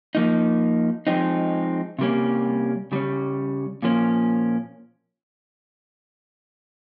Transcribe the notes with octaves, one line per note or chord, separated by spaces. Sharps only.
F3 A#3 D#4
F3 G#3 C4 D#4
C3 G3 A#3 C#4
C#3 G3 C#4
A#2 F3 A#3 C#4